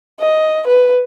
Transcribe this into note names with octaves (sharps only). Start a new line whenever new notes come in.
D#5
B4